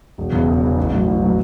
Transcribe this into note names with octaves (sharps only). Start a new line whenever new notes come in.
E1
E2 C#3
E1
E2 C#3
A1
A2 F#3
A1
A2 F#3